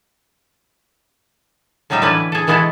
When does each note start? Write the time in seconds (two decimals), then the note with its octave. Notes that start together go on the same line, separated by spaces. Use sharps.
1.90 A2 F#3 G3 D#4 E5 G5
2.02 D3 E3 C#4 B4 D5 G#5
2.32 G#4 A4
2.47 B2 E3 G#3 B3 E4 A4